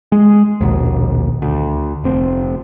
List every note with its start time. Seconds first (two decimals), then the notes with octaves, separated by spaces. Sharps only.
0.12 G#3
0.61 A#1 D#2 B2
1.42 D2
2.04 F1 C4